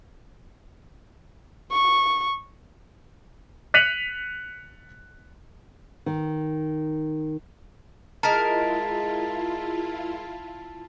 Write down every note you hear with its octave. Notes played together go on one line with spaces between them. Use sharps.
C#6
F#6 B6 C#7 D#7 F7 F#7
D#3
G#3 E4 F4 A#4 A5 A6 B6